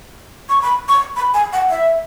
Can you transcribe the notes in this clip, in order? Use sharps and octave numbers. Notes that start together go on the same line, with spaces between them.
C#6
B5
C#6
B5
G#5
F#5
E5